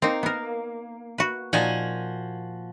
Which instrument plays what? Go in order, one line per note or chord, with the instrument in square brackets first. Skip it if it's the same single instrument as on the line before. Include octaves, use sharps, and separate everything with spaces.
[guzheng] A#3 [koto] C4 D#4
[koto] B3 A#4
F#4 B4
[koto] A#2 D#4 A5 [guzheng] F3 F#4 G#5